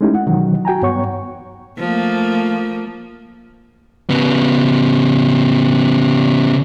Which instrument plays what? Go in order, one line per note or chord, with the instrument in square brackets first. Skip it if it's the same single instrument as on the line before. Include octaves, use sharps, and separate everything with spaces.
[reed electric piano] G#3 A3 C#4 D#4 E4 G4
F#5
B2 D#3 E3 F#3
F#4 G5 G#5 A#5
G2 B3 C#5 F#5 C#6
[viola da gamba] F3 A3 A#3
[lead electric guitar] C#3 B3